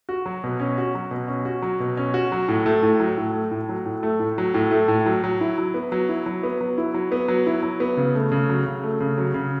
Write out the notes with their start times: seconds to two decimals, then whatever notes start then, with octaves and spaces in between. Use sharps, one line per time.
0.09 F#4
0.26 F#3
0.44 B2
0.60 C#4
0.78 F#4
0.95 F#3
1.11 B2
1.28 C#4
1.45 F#4
1.62 F#3
1.80 B2
1.97 C#4
2.14 F#4
2.32 F#3
2.48 A2
2.66 A3
2.83 A2
3.00 F#3
3.18 A2
3.34 A3
3.51 A2
3.69 F#3
3.86 A2
4.03 A3
4.20 A2
4.38 F#3
4.54 A2
4.71 A3
4.88 A2
5.06 F#3
5.24 F#3
5.41 E4
5.58 F#3
5.74 B3
5.92 F#3
6.09 E4
6.26 F#3
6.43 B3
6.61 F#3
6.78 E4
6.94 F#3
7.12 B3
7.28 F#3
7.46 E4
7.63 F#3
7.80 B3
7.97 C#3
8.15 A3
8.32 C#3
8.50 F#3
8.66 C#3
8.83 A3
9.00 C#3
9.18 F#3
9.34 C#3